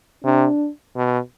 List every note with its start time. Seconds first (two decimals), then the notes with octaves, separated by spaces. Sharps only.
0.24 C3 D4
0.97 B2